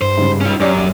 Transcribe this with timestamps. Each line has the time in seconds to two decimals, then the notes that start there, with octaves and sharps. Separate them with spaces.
0.02 G2 C5
0.17 G#2 C#3 G3
0.41 C#4 F4
0.60 F#2 C#4 G4 D5
0.77 D#1